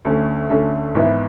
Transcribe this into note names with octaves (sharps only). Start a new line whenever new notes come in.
D2 D3 A3 C#4
D2 D3 A3 C#4
G#1 G#2 E3 B3 E4